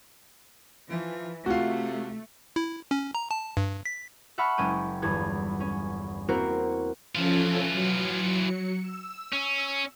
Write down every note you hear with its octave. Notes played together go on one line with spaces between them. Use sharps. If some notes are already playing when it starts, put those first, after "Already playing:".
E3 F3
C3 A3 F4 F#4
E4
C#4
A#5
A5
G2
B6
E5 F#5 A5 B5 C#6 F6
F#1 G#3 C#4 G5 D#7
G1 E2 G2 G#6
C#4
A#3 C4 E4 F#4 A#4 C5
E3 F3 C#4 F4 A4
F#3 C#7
E6
C#4